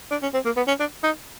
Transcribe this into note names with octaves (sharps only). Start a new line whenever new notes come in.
D4
C#4
C4
A#3
B3
C#4
D4
D#4